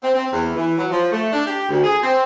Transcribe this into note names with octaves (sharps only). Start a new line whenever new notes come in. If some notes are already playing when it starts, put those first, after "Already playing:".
C4
C4
E2
E3
F#3
F3
A3
D4
G4
D2
G#4
C4